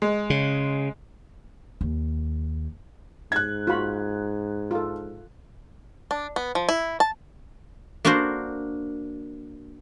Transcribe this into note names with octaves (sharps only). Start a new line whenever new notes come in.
G#3
C#3
D#2
G#2 F#6 G#6
F4 F#4 B5
F4 A4
D4
B3
F3
E4
A5
A#3 D4 F#4 A#4 C5